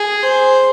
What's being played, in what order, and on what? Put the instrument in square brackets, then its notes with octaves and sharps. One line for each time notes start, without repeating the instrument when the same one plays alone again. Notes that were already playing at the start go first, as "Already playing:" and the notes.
Already playing: [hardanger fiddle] G#4
C5